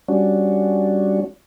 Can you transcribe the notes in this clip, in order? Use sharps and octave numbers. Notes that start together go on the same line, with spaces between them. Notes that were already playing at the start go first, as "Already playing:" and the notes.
G3 C#4 D4 F#4